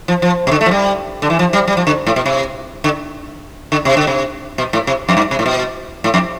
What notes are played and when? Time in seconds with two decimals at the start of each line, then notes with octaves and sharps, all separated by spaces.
0.08 F3
0.22 F3
0.47 C3
0.51 D3
0.61 A3
0.66 F3
0.71 G3
1.22 D3
1.30 E3
1.39 F3
1.53 G3
1.67 G3
1.77 F3
1.87 D3
2.07 A2
2.16 B2
2.26 C3
2.84 D3
3.72 D3
3.85 C3
3.97 D3
4.07 C3
4.58 B2
4.73 A2
4.87 C3
5.09 F2
5.17 G2
5.31 C3
5.39 A2
5.46 B2
6.04 A2
6.14 F2